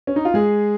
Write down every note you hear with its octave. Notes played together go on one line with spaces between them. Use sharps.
C#4
D#4
F4
G#3 G#4